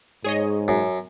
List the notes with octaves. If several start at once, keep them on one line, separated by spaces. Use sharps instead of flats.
G#2 G#4 C#5 D#5
F#2